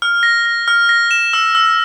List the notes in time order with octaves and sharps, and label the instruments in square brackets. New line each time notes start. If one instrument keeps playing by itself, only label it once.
[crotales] F6
A#6
A#6
F6
A#6
E7
E6
E6